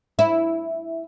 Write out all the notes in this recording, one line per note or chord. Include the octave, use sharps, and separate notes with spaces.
E4